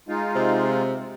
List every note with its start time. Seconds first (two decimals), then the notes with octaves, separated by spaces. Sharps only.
0.09 G#3 D#4 F4
0.35 C3